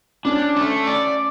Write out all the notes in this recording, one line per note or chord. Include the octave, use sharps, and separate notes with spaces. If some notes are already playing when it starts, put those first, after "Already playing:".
C#4 D4
A3
D5